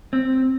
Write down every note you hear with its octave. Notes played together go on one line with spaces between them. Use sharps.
C4